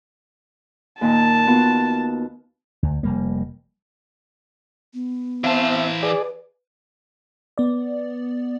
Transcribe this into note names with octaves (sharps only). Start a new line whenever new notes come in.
D#2 A#2 A5
B3 F4 F#4
D2
F1 G3 A#3
B3
E3 C4 C5 E5 F5 A5
G#4 B4 D5
B3 D5